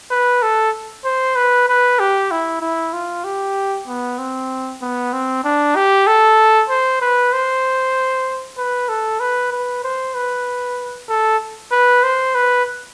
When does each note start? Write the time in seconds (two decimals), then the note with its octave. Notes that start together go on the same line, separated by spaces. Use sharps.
0.11 B4
0.42 A4
1.05 C5
1.36 B4
1.68 B4
1.99 G4
2.31 E4
2.61 E4
2.93 F4
3.24 G4
3.87 B3
4.18 C4
4.82 B3
5.13 C4
5.44 D4
5.76 G4
6.07 A4
6.69 C5
7.02 B4
7.33 C5
8.58 B4
8.89 A4
9.20 B4
9.52 B4
9.84 C5
10.14 B4
11.09 A4
11.72 B4
12.03 C5
12.35 B4